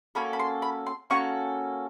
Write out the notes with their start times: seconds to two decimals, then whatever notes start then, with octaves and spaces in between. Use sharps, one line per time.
0.15 A#3 C#4 F#4 A4 B5
0.33 B5
0.39 C6
0.62 B5
0.86 C6
1.10 A#3 C#4 F#4 A4 C#6